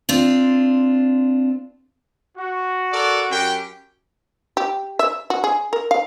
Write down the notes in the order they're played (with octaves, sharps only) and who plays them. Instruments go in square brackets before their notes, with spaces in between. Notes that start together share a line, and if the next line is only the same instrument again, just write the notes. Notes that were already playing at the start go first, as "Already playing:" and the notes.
[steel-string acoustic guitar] C4 D4 F4
[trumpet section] F#4
[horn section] A4 A#4 D5
F#2 G4 G5
[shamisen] G4
E5
F#4
G#4
A#4
F5